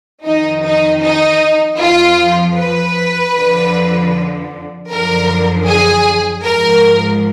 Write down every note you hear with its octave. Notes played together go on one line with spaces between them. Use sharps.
F2 D#3 D#4
D#4
D#4
F2 F3 F4
B4
F2 D3 F3
F#2 D3 F3 A#4
G#4
G#2 F3 A#4